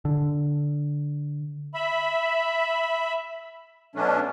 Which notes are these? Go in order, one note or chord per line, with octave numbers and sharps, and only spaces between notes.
D3
E5 B5
B2 F#3 A3 C#4 D4